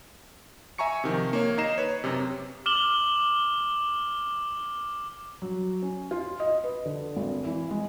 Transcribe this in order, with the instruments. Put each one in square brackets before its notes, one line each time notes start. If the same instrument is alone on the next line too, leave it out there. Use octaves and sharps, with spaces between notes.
[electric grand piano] E5 G#5 A#5 C#6 C#7
C3 D#3 F3
A#3 C#5
D#4 D#5 A#5 C7 E7
B4 C#5
F#2 C3
[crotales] D6 F6 E7 F#7 G7
[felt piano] F#3
C#4
F4
D#5
B4
D3
G#1
E3
G#3